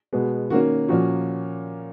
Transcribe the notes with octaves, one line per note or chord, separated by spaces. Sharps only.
B2 G#3 B3
D#3 A#3 C#4 F#4
A#2 F3 A#3 C#4 F#4